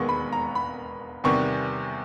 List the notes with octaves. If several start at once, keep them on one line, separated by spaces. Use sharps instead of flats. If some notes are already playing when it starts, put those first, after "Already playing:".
Already playing: E1 D#2 D#3 G#3 B3 C#6
B5
A#5
B5
E2 C3 D#3 G3 B3 C#6